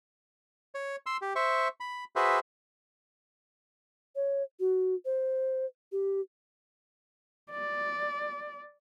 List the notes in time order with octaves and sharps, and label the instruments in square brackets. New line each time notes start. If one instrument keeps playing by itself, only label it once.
[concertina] C#5
C6 E6
G4
C5 E5 C#6
B5
F#4 G#4 B4 C5 E5
[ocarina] C#5
F#4
C5
G4
[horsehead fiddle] D5